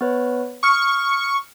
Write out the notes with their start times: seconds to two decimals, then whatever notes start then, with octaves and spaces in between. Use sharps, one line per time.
0.01 B3 B4 C#5
0.63 C#6 D#6 F6